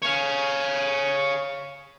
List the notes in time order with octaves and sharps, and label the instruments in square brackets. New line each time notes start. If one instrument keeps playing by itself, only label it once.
[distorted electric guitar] C#5 F5